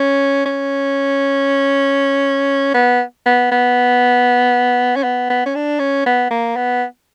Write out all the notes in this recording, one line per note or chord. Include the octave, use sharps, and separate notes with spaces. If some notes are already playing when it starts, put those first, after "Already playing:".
Already playing: C#4
C#4
B3
B3
B3
C#4
B3
B3
C#4
D4
C#4
B3
A#3
B3